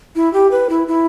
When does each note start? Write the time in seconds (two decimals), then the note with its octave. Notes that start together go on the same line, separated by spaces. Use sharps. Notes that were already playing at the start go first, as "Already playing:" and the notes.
0.15 E4
0.33 G4
0.51 B4
0.70 E4
0.88 E4